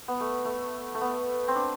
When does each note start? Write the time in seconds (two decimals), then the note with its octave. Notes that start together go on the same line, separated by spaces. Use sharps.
0.08 B3
0.20 A3
0.45 A3
0.95 A3
1.01 B3
1.48 C4
1.55 D4